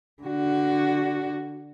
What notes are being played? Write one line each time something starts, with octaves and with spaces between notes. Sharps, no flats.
D3 F#4